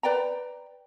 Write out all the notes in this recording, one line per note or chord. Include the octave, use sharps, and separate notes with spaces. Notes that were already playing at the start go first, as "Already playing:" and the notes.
B4 D5 G5 A#5